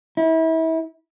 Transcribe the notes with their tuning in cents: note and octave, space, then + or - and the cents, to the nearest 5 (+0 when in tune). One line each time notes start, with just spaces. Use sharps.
E4 -30